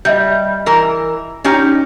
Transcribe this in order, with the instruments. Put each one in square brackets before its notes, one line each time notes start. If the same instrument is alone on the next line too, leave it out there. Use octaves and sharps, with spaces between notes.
[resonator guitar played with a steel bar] G3 [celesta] D#5 E5 G6
[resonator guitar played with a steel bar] E3 A#4
C#4 D#4 G4